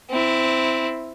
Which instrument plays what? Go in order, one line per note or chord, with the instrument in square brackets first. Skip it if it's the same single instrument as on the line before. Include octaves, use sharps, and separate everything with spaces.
[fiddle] C4 E4